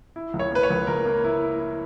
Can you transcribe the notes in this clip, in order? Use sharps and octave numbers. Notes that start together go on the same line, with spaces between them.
E4
C#2
C#5
A#3 B4
C#5
C#2
C#2 A#4
A#3
E4
E4
E4